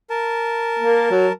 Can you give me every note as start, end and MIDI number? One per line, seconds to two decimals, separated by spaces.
0.10 1.32 70
0.10 1.32 81
0.79 1.07 58
1.11 1.28 54